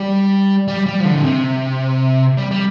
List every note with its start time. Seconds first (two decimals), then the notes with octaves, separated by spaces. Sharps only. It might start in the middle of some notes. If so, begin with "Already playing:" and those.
Already playing: G3
0.68 G3
0.86 G3
1.00 F3
1.05 D3
1.15 A2
1.23 C3
2.37 G3
2.51 G3